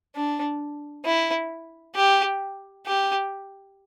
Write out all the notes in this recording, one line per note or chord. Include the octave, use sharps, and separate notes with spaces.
D4
E4
G4
G4